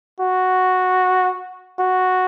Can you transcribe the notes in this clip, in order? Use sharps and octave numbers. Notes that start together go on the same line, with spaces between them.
F#4
F#4